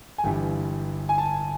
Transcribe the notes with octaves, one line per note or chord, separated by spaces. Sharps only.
G#5
G1 G2 E3 G3 G5
G#5
A5